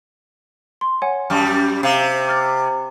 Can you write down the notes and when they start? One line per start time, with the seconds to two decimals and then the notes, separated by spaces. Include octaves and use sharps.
0.81 C6
1.02 C#5 F#5 G#5
1.30 F#2 G3 A5 C#6 F6
1.83 C3 F5
2.28 D6 F6 A6